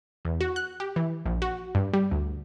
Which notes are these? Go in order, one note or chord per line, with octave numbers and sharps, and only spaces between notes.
E2
F#4
F#6
G4
E3
A#1
F#4
G2
G3
D2